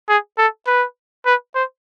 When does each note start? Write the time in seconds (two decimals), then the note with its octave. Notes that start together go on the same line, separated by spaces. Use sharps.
0.09 G#4
0.38 A4
0.67 B4
1.26 B4
1.55 C5